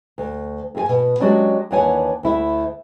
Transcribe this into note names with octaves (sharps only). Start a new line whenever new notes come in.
D2
F2 G#4 G#5
B2
F#3 G#3 C#4 D4 F#4 G4
D#2 E3 D4 C#5 F#5 G#5
D2 E4 E5